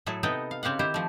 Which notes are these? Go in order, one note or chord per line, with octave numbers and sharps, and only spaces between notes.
A2 F#3 E4 G#4 A4
C3 B3 D#4 A4 D#5 G5
F5
C#3 C4 G4 F5 F#5
D#3 E4 G4 C5
F3 A3